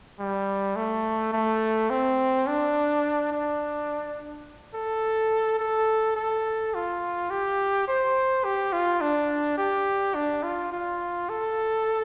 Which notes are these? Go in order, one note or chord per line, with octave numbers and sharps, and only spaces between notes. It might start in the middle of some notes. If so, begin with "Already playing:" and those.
G3
A3
A3
C4
D4
D4
A4
A4
A4
F4
G4
C5
G4
F4
D4
G4
D4
F4
F4
A4